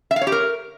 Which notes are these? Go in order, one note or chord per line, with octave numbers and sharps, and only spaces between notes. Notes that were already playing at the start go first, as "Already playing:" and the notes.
E5
F5
C#5
G4
A#4